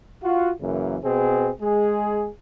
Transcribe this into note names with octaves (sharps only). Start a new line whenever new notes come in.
F4 F#4
F#2 C#3 E3 A#3
B2 C4 G#4
G#3 G#4